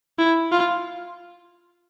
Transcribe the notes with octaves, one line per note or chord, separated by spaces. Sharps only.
E4
F4